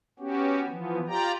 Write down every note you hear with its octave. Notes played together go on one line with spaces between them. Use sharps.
B3 C#4 F#4 G4
E3 F3 B3
F4 G4 D5 G5 A#5